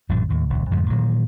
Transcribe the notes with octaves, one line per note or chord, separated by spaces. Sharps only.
A1 F#2 A#2 D3
D#2 A2
D#1 C#2
F2 G#2 D3 F3
A#2 D#3 E3 F#3